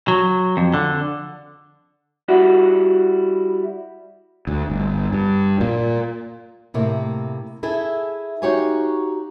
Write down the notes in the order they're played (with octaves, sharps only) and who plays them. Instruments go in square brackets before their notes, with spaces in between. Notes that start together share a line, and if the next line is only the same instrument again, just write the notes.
[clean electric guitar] F#3
F2
D3
G3 E4 F#4
[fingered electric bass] D2
G1
G2
A#2
[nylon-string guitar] A2 C3 A#3
E4 G#4 A4 E5
D#4 F#4 G4 C#5 F5 G#5